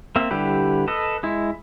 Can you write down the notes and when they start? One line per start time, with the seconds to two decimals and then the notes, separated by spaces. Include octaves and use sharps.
0.16 A#3 C4 E5
0.31 D3 G3 E4 G4 B4
0.88 A4 B4 D#5
1.23 G#3 E4